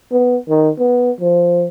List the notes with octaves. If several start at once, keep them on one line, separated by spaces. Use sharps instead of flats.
B3
D#3
B3
F3